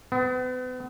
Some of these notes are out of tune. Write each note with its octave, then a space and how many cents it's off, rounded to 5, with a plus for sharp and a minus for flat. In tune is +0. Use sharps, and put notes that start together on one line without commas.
B3 +40